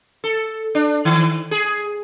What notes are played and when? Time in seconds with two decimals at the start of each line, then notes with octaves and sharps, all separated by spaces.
0.24 A4
0.75 D4
1.05 D#3
1.51 G#4